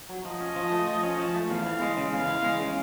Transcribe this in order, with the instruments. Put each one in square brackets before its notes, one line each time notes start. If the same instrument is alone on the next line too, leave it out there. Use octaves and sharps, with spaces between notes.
[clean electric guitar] F#3
[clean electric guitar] F3 [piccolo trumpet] D#5
[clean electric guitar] C#4
F3
A3
F3
C#4
F3
A3
[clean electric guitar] E2 [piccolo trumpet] F5
[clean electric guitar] E3
G#3
C#3
[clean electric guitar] E2 [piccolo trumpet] F5
[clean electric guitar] E3
G#3
C#3